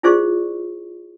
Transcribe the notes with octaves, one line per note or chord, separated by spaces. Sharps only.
E4 F4 G#4 C5 D5 C#6